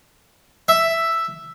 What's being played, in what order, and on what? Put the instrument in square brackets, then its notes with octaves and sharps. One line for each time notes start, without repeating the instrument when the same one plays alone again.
[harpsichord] E5